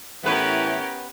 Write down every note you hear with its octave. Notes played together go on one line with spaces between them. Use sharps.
A2 E3 B3 C#4 G4 A#4 B4